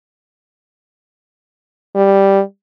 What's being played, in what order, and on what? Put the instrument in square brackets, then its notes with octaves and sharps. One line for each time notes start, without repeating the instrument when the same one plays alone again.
[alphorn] G3